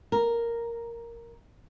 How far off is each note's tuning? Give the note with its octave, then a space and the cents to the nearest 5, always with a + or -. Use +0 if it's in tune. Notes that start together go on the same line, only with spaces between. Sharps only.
A#4 +0